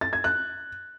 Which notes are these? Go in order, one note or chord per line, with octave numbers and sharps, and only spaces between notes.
A6
G#6
F#6